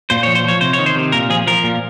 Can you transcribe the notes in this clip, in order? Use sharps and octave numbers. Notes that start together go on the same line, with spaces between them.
A#2 C5
F3 C#5
C5
F3 C#5
C3 C5
C#5
D#3
C5
C3
A#2 A#4
F3 G#4
F3 A#4
A#2